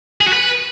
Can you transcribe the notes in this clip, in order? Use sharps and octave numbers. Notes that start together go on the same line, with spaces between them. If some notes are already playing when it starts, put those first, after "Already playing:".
G#4
F#4
B4